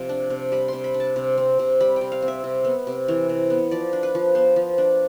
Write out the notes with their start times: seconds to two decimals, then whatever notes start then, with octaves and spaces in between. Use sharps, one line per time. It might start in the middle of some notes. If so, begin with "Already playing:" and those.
Already playing: C3 F3
0.09 D4
0.30 C3
0.52 G3 B5
0.68 C3 C6
0.84 B5
0.94 D4
1.00 A5
1.16 C3
1.38 C4
1.59 C3
1.80 G3 B5
1.96 C3 G5
2.12 F5
2.22 C4
2.28 E5
2.44 C3
2.65 B3
2.87 C3
3.08 E3
3.29 C3
3.50 B3
3.71 F3 D5
3.93 D4
4.03 B4
4.15 F3
4.35 B3 C5
4.56 F3
4.78 D4